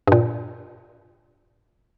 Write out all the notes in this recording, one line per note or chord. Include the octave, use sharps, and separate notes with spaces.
G2 A#2